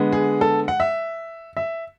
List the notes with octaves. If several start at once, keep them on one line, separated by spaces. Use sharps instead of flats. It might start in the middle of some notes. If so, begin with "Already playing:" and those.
Already playing: D3 G#3 B3
G#4
A4
F#5
E5
E5